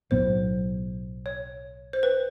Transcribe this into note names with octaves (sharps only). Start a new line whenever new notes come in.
B1 A2 F#3 B3 C5
C#5
C5
B4